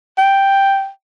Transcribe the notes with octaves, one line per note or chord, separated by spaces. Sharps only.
G5